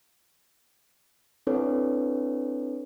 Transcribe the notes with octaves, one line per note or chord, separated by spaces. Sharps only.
C4 D4 E4 A4 B4 C#5